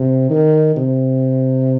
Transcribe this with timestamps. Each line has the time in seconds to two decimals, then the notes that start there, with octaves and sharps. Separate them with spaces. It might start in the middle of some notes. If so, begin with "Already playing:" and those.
Already playing: C3
0.30 D#3
0.76 C3